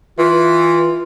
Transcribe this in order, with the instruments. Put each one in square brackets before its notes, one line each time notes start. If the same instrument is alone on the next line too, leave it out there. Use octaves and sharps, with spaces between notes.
[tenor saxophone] E3 [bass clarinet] F4